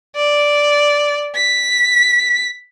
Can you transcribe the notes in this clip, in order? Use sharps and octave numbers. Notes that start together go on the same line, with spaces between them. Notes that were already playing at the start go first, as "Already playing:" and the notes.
D5
B6